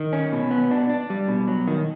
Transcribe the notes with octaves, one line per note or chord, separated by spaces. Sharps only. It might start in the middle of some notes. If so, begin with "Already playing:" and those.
Already playing: D#3
C#4
B2
B3
D4
D4
G3
B2
F#3
D#3